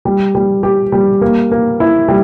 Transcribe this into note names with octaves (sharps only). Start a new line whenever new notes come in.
G3
G3
G4
G3
A#3
A#3
E4
G3